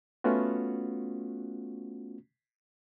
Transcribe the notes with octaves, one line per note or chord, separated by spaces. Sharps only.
A3 B3 C#4 F4 F#4